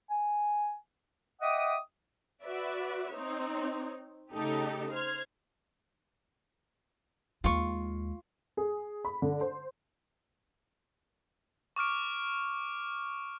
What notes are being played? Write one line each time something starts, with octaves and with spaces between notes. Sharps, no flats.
G#5
D#5 E5 F#5 G5 D6 D#6
F#4 B4 D5 E5
C4 D#4 C#5
C#3 A3 D#4 G4 A4
C5 F6 G#6
D#2 G#3 F4 C#6
G#4
B5
D3
C5
C#6 D6 F6 D7